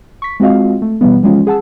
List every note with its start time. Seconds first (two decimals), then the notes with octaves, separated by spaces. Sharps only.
0.22 C#6 B6
0.40 G#3 C4 F4 F#4 D#5 F5
0.82 A3
1.01 B2 E3 G3 B3
1.23 E3 F3 G#3 C#4 F4
1.47 G#4 F#5 A5 E6